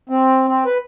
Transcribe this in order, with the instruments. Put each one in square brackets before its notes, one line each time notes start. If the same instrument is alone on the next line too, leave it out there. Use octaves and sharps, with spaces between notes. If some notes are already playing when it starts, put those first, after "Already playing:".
[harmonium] C4
C4
B4